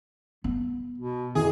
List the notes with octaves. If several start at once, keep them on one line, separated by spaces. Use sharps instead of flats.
B3
B2
F2 E3 G#4